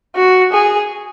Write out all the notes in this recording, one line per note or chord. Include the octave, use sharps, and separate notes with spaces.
F#4
G#4